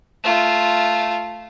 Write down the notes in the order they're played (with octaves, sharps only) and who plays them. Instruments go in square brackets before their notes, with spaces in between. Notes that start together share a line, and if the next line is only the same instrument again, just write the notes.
[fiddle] A3 F4